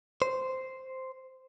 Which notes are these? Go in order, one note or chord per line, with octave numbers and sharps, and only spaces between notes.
C5